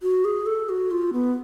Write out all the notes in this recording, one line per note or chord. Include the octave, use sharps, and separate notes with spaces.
F#4
G#4
A4
F#4
F4
B3